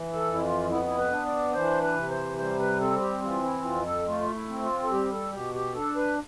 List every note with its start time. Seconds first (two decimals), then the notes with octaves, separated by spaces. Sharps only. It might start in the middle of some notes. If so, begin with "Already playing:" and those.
Already playing: E3
0.14 A4
0.27 F2
0.33 E4
0.41 F4
0.69 B3 E4
0.87 E4
0.98 B4
1.11 D4
1.26 D5
1.54 E3 C5
1.82 B4
1.96 C3
2.10 C5
2.38 G3 C5
2.59 B4
2.80 C4 A4
3.01 G4
3.22 E3 F4
3.43 E4
3.64 F2 F4
3.85 A4
4.06 A3 F4
4.35 E4
4.49 C4
4.62 F4
4.83 A4
4.91 G3 G4
5.12 A4
5.33 B2 G4
5.54 G4
5.75 D4 A4
5.96 B4